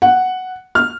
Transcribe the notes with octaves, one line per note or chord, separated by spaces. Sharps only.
F#5
F6